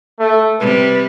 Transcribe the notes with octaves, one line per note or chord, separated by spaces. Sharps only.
A3
C3 G3 B4